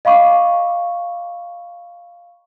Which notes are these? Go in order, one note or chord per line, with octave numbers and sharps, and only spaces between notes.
D#5 F5 B5 C#6 D6